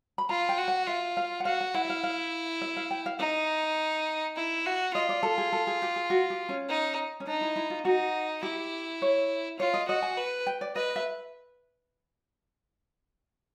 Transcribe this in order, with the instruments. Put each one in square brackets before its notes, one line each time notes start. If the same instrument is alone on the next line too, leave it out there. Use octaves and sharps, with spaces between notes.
[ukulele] B5
[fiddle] F4 [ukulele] A#5
[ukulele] G5
[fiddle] F#4
[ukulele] F#5
[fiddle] F4 [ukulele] E5
[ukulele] F5
F#5
[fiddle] F#4 [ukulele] F5
[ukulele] F#5
[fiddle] E4 [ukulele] F#5
[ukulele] E5
F5
F5
E5
F5
G5
F5
[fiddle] D#4 [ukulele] E5
[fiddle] E4
F#4
[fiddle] F4 [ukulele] D#5
[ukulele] D5
A4
G#4
A4
G#4
G4
G#4
F#4
G4
C#4
[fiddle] D#4
[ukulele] C#4
[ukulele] D4 [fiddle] D#4
[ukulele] E4
E4
F4
[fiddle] D#4 [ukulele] F#4
[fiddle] E4 [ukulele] G4
[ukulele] C#5
[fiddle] F4 [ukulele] C#5
[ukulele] D#5
[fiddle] F#4 [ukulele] D#5
[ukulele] G#5
[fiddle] B4
[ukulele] G5
D5
[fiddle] B4 [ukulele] D#5
[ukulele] E5